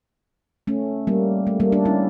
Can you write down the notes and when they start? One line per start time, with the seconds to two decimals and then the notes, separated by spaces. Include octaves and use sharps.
0.67 A3 C#4
1.07 G3 A#3
1.47 A3
1.60 G3 A#3
1.72 A#3 D4
1.85 C#4 E4